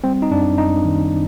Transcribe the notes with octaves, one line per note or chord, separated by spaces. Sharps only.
G3 C4
D#4
F#2 D4
F#2 D#4
D#3